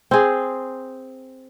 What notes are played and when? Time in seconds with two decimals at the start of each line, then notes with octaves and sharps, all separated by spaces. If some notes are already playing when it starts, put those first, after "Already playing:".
0.11 C4 G#4